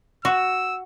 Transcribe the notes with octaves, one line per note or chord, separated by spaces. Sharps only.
F#4 E6